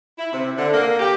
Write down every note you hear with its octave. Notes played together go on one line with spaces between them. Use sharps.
E4
C3
D3
A#3
G4